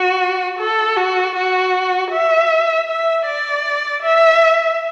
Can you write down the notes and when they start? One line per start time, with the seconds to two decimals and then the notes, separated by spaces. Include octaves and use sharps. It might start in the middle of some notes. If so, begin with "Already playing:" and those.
Already playing: F#4
0.59 A4
0.97 F#4
1.35 F#4
2.11 E5
2.88 E5
3.26 D5
4.03 E5